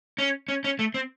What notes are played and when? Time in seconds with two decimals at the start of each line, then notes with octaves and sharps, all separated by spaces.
0.18 C#4
0.48 C#4
0.64 C#4
0.79 A3
0.94 C4